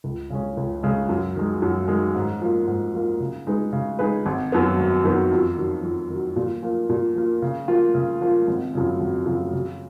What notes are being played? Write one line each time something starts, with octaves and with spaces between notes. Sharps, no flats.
C#2
C#3 G#3 C#4
C#2
C#3 G#3 C#4
F#2
D#3 G#3
F#2
D#3 G#3
G#2
F3 A#3
G#2
F3 A#3
C#3
G#3 D#4 G#4 B4
C#3
G#3 D#4 G#4 B4
G#1
F#2 D#3 F#3 B3
G#1
F#2 D#3 F#3 B3
F2
D#3 F#3
F2
D#3 F#3
A#2
F3 A#3
A#2
F3 A#3
C#3
F3 A#3 F4
C#3
F3 A#3 F4
G#1
F#2 C#3 F3
G#1
F#2 C#3 F3
C#3